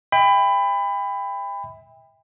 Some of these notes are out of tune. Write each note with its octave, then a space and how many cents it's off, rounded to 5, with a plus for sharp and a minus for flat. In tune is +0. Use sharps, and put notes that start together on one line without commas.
E5 -30 G5 +35 B5 +20